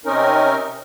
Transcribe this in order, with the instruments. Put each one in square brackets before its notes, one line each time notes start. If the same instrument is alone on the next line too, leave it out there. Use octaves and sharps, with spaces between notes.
[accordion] C3 C4 C#4 D#4 A#4